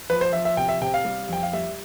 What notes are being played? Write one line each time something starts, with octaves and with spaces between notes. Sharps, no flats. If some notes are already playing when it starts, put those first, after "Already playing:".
F3 B4
C5
F3 E5
E5
C3 G5
E5
C3 G5
F5
G3
F2 G5
F5
G3 E5